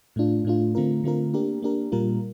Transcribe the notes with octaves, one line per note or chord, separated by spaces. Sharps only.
A2 A3 D4 F4
A2 A3 D4 F4
D3 A3 C4 F4 A#4
D3 A3 C4 F4 A#4
A#3 D4 G4 A#4
A#3 D4 G4 A#4
A#2 G3 A#3 F4 A#4